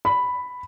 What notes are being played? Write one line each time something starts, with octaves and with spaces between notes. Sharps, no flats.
B5